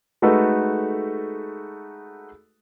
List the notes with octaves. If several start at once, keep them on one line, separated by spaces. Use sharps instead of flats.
G#3 A3 D#4 F#4 A4 B4